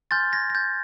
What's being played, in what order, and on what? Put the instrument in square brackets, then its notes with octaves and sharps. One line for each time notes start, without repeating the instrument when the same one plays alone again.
[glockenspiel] G#5 C6 F6 G6 A6
G#6 A#6
A#6
G6 A6